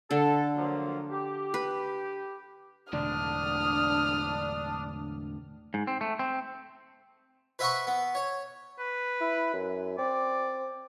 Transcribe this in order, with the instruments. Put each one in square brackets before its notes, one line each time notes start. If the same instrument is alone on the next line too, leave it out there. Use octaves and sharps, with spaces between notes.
[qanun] D3 [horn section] A4
[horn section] F3 F#3 A#3
G4
[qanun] B4
[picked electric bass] E1 [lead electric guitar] A2 D3 [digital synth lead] D4 [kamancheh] D#6 F6
[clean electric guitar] G#2
C4
A3
C4
[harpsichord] B4 C5 E5 F#5 B5 C#6
B3
C#5
[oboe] B4
[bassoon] E4
F#2
[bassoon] C4 [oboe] D5